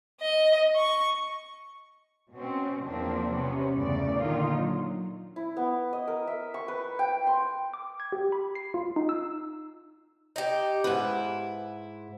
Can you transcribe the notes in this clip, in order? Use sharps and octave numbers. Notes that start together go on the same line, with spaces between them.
D#5
C#6
B2 C4 C#4
E2 F3 A#3 C4 D4
C3 B3 C#4
E2 G2 C#3 A3 D5
A#2 D3 D#3 D#4 F4
F#3
E4
B3
D#5
A#4
E5
C#6
B4
G5
C6
D6
G#6
G4
B5
C7
F4
D#4
E6
D#4 G4
G#2 E4 B4